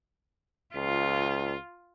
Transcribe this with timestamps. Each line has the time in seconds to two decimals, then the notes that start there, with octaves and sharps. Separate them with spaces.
0.75 C#2 F4